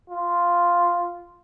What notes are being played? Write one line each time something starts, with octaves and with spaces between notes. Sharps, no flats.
F4